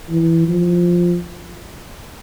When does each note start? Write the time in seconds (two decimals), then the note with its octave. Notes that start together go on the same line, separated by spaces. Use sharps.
0.10 E3
0.48 F3